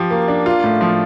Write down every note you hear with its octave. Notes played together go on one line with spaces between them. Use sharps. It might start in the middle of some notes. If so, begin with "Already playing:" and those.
Already playing: F3 G4
A#3
D4
F4
A2
F3